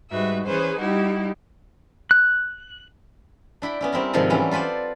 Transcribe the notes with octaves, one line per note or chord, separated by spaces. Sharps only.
G#2 G3 F#4 B4 E5
E3 C#4 G#4 B4 C5
G3 D#4 E4 F#4 G4
F#6
D4 E4 G5 B5
B3 C#4 E4
G3 C4 E4 A#4
G#2 C3 D#3 F3 F4 A4
E3 F#3 G3 C#4 E4 F#4
F4 A4 B4 C5 D5